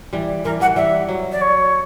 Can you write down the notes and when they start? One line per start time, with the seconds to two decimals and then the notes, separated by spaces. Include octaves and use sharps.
0.13 E3 G3
0.44 E3 G3 A#4
0.60 E3 G3 F#5
0.76 E3 G3 E5
1.09 F#3
1.32 D5
1.41 C#5